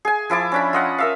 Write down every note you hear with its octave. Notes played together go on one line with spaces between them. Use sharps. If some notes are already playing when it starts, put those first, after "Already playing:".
G#4 G#5
F3 E4 A5 D6
C#4 D4 B5
F4 D#5 F#5
A#4 E5 F5